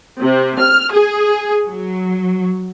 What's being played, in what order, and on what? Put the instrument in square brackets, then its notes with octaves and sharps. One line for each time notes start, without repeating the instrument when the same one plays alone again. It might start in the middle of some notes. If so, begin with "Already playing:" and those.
[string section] C3
F6
G#4
F#3